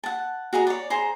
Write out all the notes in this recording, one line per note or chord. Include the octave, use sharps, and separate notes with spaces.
F#5 A5
F#4 G#4 D#5 A#5
C#5 D5
G#4 C5 A#5